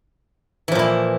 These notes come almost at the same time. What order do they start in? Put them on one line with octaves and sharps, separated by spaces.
E3 F3 A#2 E4